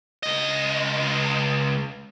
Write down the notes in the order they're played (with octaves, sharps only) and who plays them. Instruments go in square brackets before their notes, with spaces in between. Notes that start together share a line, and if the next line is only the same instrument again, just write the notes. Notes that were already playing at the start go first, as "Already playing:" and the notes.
[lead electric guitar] C#2 D#5